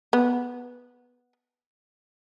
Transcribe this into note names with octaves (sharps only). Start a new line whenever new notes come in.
B3